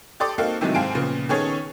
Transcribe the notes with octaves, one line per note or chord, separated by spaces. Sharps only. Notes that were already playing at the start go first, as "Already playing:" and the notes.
G4 A4 D5 C6 D6 D#6
A#3 C4 D#4 F#4 A4 F5
C3 D#3 E3 F#3 G#3 A3
G#2 C4 F5 G#5 A5 D7
A#2 C#3 F3 B3
D#3 B3 C#4 G#4 A4 C#5